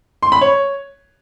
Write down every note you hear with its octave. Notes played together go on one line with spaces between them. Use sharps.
C6
B5
C#5